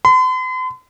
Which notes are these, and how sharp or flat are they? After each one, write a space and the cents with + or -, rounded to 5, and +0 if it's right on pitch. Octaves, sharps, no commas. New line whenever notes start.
C6 -45